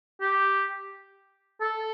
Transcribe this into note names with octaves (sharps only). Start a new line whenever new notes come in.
G4
A4